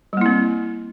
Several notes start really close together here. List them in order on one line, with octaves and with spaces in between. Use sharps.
G3 A#3 E4 C4